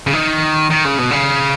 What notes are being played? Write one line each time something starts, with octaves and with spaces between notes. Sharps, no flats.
C#3
D#3
D#3
C#3
B2
C#3